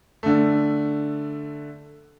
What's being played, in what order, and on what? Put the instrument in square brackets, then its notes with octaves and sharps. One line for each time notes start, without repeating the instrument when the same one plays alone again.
[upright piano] D3 A3